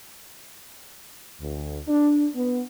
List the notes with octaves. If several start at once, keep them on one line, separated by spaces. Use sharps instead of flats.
D2
D4
B3